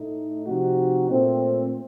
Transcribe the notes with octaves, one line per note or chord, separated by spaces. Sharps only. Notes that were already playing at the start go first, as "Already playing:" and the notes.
Already playing: A2 A3 D#4
C3 F3 C4 D#4 F#4
A#2 A3 C4